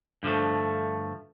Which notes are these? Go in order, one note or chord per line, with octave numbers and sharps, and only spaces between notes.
G2 D3 F3 A3